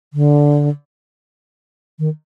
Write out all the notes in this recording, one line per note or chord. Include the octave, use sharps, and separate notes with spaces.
D3
D#3